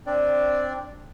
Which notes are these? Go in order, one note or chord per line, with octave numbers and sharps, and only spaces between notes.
C4 D4 D5